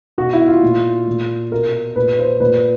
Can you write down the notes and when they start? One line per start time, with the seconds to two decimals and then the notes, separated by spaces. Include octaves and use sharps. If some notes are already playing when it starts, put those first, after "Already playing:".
0.18 B2 F#4
0.33 E4
0.48 F4
0.63 A#2
1.08 A#2
1.51 B2 A#4
1.96 A#2 B4
2.19 C5
2.40 A#2 B4